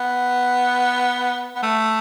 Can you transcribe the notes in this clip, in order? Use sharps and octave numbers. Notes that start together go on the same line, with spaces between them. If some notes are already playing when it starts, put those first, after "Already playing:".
Already playing: B3
B3
A3